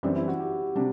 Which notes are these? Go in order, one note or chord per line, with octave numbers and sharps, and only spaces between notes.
F#2 E3 G3 C4 D4
E4
F#4
G4
C3 G3 D4